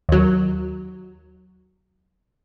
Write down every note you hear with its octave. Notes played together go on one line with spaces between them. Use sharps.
D#2 F#3